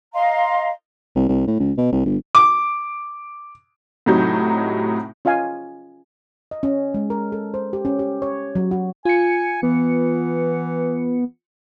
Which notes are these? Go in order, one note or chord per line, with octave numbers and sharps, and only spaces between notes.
D#5 F5 A#5 C6
C2
C2
A2
C#2
B2
C2
G1
D6
A2 C3 F#3 D#4 G6
C#4 F4 D#5 F5 G#5
D#5
C#4
G#3
A#4
A4
C5
G4
C#4
G4
C#5
F#3
F#4
F4 G#5 C#7
E3 B3